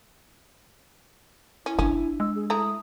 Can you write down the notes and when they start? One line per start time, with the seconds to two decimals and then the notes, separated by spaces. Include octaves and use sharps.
1.66 C#4 E4
1.79 G1 C#4 D4
2.20 G#3 E6
2.36 G#4
2.50 A3 E4 A#5 D#6